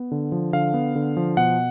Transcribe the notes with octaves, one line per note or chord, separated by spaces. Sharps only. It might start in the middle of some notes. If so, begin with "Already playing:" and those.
Already playing: B3
D3
F3
D3 F5
B3
D3
F3
B2 F#5